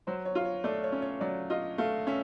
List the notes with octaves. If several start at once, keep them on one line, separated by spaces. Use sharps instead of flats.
F#3 C5
C#5
F4
C#5
A3 D5
C#5
C#4
C#5
F#3 D5
F4 D#5
A3 F5
C#4 E5